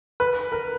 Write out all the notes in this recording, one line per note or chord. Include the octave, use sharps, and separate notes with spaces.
B4
A#4